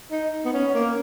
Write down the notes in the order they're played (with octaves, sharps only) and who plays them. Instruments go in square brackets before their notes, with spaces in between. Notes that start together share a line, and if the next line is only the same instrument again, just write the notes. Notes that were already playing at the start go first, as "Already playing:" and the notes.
[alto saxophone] D#4
B3
C#4
A#3